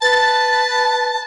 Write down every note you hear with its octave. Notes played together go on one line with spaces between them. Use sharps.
B4 A5 A6